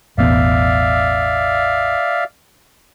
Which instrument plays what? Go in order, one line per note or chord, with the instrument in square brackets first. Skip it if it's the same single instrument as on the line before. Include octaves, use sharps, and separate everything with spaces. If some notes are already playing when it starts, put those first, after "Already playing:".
[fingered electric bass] E1 A1 B3 [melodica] D5 E5 F5